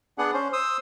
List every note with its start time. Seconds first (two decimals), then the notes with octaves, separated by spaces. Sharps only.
0.18 B3 D4 G#4 F#5
0.33 C#4 C5
0.53 C5 D#6 E6